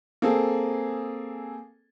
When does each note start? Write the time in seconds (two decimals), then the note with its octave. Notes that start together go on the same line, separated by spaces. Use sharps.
0.22 A#3 C4 G#4 A4